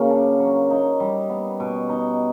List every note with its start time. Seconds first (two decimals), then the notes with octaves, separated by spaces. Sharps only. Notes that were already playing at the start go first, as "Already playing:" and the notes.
Already playing: C#3 F#3 A#3
0.10 D4
0.40 F#3
0.70 D#4
1.00 G3
1.30 B3
1.60 B2
1.89 D#4